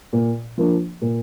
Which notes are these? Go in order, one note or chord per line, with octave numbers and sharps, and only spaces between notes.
A#2
F3 A#3 D4
A#2